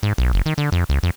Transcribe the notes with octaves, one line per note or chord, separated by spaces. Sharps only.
G#2
B1
F#1
D#3
D3
F2
C#2
F2